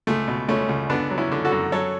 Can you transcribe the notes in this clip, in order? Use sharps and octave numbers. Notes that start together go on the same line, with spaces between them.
C#2 A3
B2
C#2 A3 C#4
C#2
D3 B3 D4
F#3
C#4 E4
D3
F#4 A4
F#2
F#3 A4 C#5